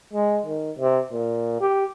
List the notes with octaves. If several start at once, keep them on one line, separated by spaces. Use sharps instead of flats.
G#3
D#3
C3
A#2
G4